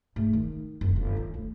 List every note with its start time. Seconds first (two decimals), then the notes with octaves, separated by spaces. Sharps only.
0.16 G#2 A3
0.33 D#3
0.81 F#1
0.96 G1
1.17 D#3
1.34 D2